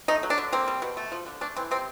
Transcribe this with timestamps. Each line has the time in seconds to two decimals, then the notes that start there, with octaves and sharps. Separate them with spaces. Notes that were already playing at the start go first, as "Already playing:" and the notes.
0.08 A3 D#4
0.23 F#3
0.30 D4
0.38 D3
0.52 A#3 C4
0.68 G3
0.82 B2
0.97 A3
1.12 F3
1.27 D3
1.41 A3 D4
1.57 E3 C4
1.71 C3 C4